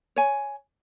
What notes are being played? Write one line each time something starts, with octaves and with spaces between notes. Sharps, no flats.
C#5 G#5